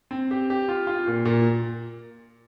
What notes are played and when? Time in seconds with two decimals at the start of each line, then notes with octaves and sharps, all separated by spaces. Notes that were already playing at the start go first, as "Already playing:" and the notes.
0.11 C4
0.31 G4
0.50 G4
0.69 F4
0.87 F4
1.07 A#2
1.25 A#2